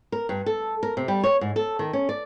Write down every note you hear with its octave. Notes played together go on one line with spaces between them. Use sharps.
A#4
G2
A4
A#4
C3
G3
C#5
G#2
A4
D#3
C#4
D5